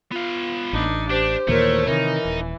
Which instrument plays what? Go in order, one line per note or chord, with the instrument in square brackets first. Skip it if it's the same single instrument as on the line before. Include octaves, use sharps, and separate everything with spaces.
[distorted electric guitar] B3 F5 [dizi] F4
[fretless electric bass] A1 [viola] D4 D#4
[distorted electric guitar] D4 [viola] G4 [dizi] C5
[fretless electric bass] D#2 A#2 E3 [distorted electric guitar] A3 [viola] A#4 C#5
[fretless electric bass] C3 D#3 [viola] E3 [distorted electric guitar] D#4 [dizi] A#4
[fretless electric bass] D#1